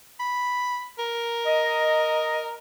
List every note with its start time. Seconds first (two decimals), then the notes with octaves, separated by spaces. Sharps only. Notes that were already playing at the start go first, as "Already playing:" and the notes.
0.20 B5
0.99 A#4
1.45 D#5